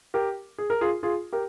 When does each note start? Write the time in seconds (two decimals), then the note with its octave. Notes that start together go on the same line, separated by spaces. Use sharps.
0.14 G4 A#4
0.58 G#4
0.70 A#4
0.81 F4 G#4
1.03 F4 G#4
1.33 G4 A#4